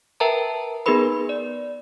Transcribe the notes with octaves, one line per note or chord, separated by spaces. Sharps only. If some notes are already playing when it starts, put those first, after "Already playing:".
A#4 B4 E5 G5 A5 A#5
B3 D#4 G#4 A#4 B4 B5
D5